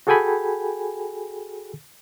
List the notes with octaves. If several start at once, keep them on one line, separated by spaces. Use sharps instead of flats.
F#4 G#4 A4 G5 G#5 B5